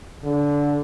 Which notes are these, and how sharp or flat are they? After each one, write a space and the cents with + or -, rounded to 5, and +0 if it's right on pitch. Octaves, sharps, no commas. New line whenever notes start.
D3 -15